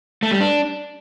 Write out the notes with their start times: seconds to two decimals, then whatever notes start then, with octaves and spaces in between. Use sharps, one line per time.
0.23 A3
0.32 G3
0.41 D4